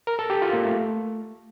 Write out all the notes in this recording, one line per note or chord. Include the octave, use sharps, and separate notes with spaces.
A#4
A4
G4
F4
A#3
A3